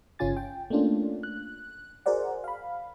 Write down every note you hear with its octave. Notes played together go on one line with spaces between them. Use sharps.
G1 C#3 C#4 F4 G#5 A6
G5
A3 A#3 C#4 D4 F4
F#6
F#4 G#4 A#4 C5 D5 F#5
F5 B5